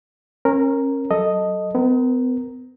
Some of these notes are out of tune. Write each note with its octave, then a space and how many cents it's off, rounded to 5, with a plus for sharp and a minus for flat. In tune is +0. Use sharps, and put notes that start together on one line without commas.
C#4 -30 A#4 +0
F#3 +20 A4 +5 D#5 +0
B3 +45 A#4 +0